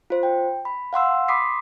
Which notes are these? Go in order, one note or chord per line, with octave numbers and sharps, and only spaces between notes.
F4 C5
G5
B5
F5 F#5 C6 E6
B5 C6 D6 D#6 B6 C7